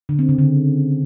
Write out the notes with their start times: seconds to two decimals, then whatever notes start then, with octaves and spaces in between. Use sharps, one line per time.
0.09 D3
0.19 C4
0.29 C#3
0.39 D3